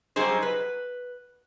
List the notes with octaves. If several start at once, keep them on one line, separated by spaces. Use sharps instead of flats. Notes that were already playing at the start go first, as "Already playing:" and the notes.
F#3 G3 D#4 G#4 C5
B4